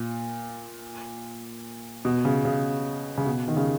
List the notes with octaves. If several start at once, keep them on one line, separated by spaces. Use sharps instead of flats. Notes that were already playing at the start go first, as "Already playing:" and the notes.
Already playing: A#2
B2
C#3
C#3
C#3
B2
D#3
C#3